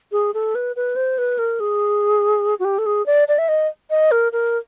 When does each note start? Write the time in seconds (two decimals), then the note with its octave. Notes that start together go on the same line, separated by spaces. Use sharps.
0.12 G#4
0.34 A4
0.55 B4
0.76 B4
0.96 C5
1.18 B4
1.38 A#4
1.60 G#4
2.59 F#4
2.65 G4
2.78 A4
2.86 G#4
3.06 D5
3.28 D5
3.38 E5
3.48 D#5
3.90 D#5
4.11 A#4
4.32 A#4